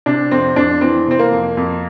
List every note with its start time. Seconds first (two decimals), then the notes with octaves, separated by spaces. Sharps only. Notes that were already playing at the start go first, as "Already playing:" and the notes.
0.06 C3 D4
0.31 F2 C4
0.56 F2 D4
0.81 E3 C4
1.07 C3 C4
1.19 A#3
1.32 F2
1.57 F2